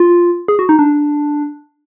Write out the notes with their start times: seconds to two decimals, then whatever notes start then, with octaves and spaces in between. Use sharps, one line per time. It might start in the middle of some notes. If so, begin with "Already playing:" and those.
Already playing: F4
0.48 G#4
0.59 F#4
0.69 D#4
0.79 D4